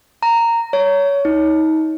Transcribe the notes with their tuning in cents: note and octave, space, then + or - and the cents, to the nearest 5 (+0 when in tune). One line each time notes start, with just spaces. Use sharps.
A#5 -10
C#5 +20
D#4 +30